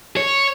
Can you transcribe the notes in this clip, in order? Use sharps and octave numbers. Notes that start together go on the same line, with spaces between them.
C#5